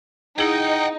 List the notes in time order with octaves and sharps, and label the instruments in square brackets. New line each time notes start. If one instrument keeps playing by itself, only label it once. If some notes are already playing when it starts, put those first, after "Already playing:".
[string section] D#4 [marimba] E4 G#4 [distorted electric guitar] F#5 G5